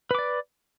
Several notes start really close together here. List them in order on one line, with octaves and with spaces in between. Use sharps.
B4 D6 D5